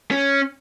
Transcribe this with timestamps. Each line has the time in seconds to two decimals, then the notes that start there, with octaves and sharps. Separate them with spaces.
0.11 C#4